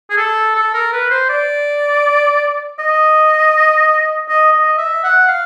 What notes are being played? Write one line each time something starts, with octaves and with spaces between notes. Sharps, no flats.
G#4
A4
A4
A#4
B4
C5
D5
D#5
D#5
D#5
E5
F#5
F5